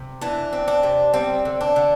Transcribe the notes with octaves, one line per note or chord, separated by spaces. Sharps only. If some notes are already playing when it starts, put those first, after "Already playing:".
Already playing: C3
E3 D4
C4
D4
C3
G3 C4
D3
D4
D3